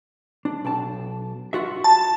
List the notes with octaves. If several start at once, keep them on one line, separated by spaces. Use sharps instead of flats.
D4
B1 G5 A5
F4 F#4 E5
A5